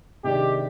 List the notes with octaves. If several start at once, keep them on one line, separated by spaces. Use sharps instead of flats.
C3 D#3 G#3 D4 G4